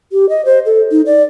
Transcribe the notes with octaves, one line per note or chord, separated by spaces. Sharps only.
G4
D#5
C5
A4
D#4
D5